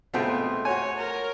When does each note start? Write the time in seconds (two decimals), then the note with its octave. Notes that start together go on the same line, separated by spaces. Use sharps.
0.14 B2 G#3 A3 C4 F4 G5
0.65 F#4 C#5 G#5
0.97 A#4